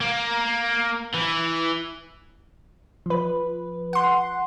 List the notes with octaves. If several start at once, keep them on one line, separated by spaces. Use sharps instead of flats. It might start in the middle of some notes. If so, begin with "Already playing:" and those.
A#3
E3
F3 B4
F#5 C6